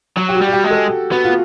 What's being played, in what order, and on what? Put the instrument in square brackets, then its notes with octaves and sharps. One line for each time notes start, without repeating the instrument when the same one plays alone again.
[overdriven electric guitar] F#3 [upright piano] F#4
[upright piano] G4
F#4
[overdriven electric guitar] G3
[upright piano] F#4
G4
[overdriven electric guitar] G#3
[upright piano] A4
F#4
[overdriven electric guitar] B3 [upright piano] F#4
[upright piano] F4